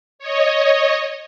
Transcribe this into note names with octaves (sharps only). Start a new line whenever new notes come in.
C#5 D#5